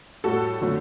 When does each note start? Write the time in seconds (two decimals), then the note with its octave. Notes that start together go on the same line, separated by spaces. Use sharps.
0.24 A2 G3 F#4 A4
0.61 D3 F#3 A3